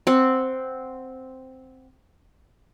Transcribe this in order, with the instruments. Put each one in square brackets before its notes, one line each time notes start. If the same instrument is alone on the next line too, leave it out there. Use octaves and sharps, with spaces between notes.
[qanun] C4 F#5